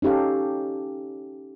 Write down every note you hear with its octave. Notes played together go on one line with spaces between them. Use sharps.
C#4 D#4 G4 A4 F5